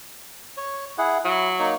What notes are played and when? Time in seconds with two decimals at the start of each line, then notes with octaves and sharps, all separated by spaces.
0.57 C#5
0.98 E4 G#4 F#5
1.25 F#3 E4
1.59 A#3 D#4 C#5